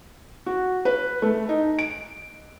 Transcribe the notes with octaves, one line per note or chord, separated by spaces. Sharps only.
F#4
B4
A3
D#4
D7